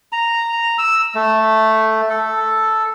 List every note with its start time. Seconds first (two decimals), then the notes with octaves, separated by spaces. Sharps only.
0.12 A#5
0.78 E6
1.15 A3
2.09 A4